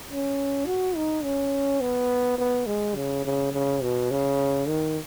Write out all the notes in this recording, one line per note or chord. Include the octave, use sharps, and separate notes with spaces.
C#4
F#4
D#4
C#4
B3
B3
G#3
C#3
C#3
C#3
B2
C#3
D#3